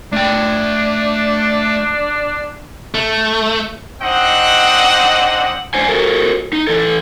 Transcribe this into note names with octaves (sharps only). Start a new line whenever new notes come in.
A3 D4 G5
A3
C4 D4 D#4 D#5 F#5
G2 D4 C5 G#5
F#4 A4 A#4
D#4
E3 A4